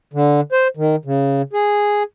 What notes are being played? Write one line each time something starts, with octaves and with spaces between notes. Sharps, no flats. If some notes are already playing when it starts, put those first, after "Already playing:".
D3
C5
D#3
C#3
G#4